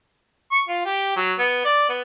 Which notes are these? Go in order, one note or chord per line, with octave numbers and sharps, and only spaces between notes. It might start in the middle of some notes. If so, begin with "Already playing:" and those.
C#6
F4
G4
F#3
B3
D5
B3